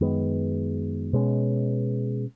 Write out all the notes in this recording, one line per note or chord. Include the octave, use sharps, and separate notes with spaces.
F#2 D#3 G#3 B3
B2 G#3 C#4